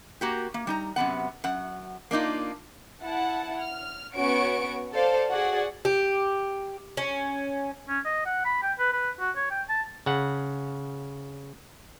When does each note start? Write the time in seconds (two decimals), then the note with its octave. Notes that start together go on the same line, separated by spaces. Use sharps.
0.21 A#3 F#4 G4
0.54 A#3
0.67 G3 D#4 A#5
0.96 F#2 C3 B3 F#5
1.44 F#2 F#5
2.11 A#3 D4 D#4 F4
3.04 E4 F#5 A5
3.60 F6
4.15 B3 C#4 F#4 C#6 D7
4.93 A4 C5 D5 F5
5.31 F#4 G#4 D5 F#5
5.85 G4
6.97 C#4
7.89 C#4
8.05 D#5
8.26 F#5
8.45 B5
8.63 G5
8.79 B4
8.93 B4
9.20 F#4
9.36 C#5
9.51 G5
9.69 A5
10.06 C#3 F#5